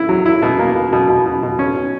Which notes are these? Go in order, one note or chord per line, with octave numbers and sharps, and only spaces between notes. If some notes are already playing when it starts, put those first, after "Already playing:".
Already playing: E4
F#3
E4
B2
A#3
B2
B2
B2
B2
B2
C#4
B2